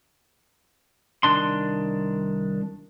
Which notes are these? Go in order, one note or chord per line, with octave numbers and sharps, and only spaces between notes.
C2 D#3 D4 C6